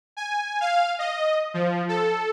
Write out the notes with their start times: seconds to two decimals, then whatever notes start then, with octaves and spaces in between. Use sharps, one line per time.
0.17 G#5
0.61 F5
0.99 D#5
1.54 F3
1.89 A4